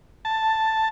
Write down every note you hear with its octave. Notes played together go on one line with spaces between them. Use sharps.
A5